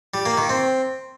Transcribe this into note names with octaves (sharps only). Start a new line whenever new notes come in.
G3
A#3
D#3
C4